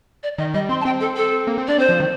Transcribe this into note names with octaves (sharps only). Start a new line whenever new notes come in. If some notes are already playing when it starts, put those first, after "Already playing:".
D5
D#3 D#5
G3 D#5
C4 C6
A5
C4 G5
A4
A4
A#3
C4
D4 D5
C4 C5
F3
D#3